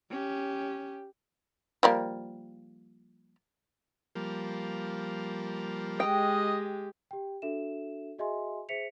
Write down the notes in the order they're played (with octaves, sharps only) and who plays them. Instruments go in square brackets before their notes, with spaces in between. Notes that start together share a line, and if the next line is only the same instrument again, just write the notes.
[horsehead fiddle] C#4 G4
[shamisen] F3 G3 A#3
[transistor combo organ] F3 G3 A#3
[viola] G#3 G4 [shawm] D#5 [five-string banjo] G5
[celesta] G4 G5
D4 F#4 A4 E5 E7
F#4 G#4 D#5 E5 G#5 C6
G#4 C5 E5 B6 C#7 F7